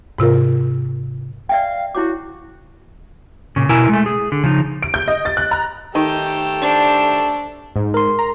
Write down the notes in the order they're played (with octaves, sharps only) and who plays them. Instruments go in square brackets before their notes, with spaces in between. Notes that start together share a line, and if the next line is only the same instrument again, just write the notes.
[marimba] G#2 C3 F4 A#4
[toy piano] D5 E5 G5 [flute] F5
[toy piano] E4 C#5 D6 [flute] F#4
[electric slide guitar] A#2 C#3
B2 E4 A#4 G#5
G#3 A3
G#4
D3
C#3 F3 D#4
[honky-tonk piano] D7
G6
D#5
A6
F#6
A#5
[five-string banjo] D#3 [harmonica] A3 G4 A4 [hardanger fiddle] G5
[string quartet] D4 [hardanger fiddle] C5 A5
[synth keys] G#2
[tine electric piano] A#4 C6
[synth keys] A#5